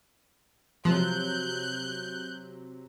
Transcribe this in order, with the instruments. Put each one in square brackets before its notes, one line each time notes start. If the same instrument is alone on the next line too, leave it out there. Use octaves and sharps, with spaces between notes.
[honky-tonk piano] C3 F#3 [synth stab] F3 [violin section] F#6 G6